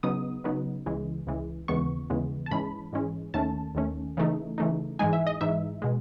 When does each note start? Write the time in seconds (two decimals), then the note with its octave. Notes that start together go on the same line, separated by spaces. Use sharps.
0.03 C#3 F#3 B3 D#4 D#6
0.44 C#3 F#3 B3 D#4
0.86 C#2 C#3 E3 G#3
1.27 C#2 C#3 E3 G#3
1.68 D#2 C#3 E3 G#3 B3 C#6
2.10 D#2 C#3 E3 G#3 B3
2.46 A5
2.51 G#2 E3 G#3 C#4 B5
2.93 G#2 E3 G#3 C#4
3.34 D#2 D#3 A3 C#4 A5
3.75 D#2 D#3 A3 C#4
4.17 C#3 E3 A3 D#4
4.58 C#3 E3 A3 D#4
4.99 G#2 E3 G#3 D#4 G#5
5.13 E5
5.27 D#5
5.41 G#2 E3 G#3 D#4 E5
5.82 B2 G#3